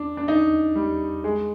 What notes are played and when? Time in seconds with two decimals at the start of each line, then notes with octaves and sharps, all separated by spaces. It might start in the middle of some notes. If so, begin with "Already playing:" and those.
Already playing: D4
0.17 D4
0.28 D#4
0.76 G3
1.24 G#3